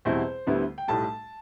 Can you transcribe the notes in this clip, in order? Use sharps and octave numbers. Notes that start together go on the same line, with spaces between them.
E2 B2 G3 C4 E4 C5
D2 D3 G3 B3 E4
G5
B1 A2 G3 A5